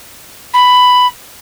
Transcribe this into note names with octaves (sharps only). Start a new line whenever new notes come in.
B5